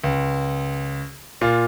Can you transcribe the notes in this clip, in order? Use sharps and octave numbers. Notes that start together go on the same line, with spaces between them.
C#2
A#2 F4